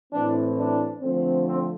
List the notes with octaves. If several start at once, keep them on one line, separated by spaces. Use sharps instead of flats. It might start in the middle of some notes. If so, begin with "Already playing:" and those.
A2 E3 A3 C4 D4
D4
D3 F3 A3 C4
C4